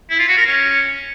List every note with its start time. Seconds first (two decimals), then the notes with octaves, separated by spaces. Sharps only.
0.10 E4
0.19 F4
0.28 F#4
0.37 A#4
0.46 C#4